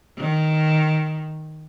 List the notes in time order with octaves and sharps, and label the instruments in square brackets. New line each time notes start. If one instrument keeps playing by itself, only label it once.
[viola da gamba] D#3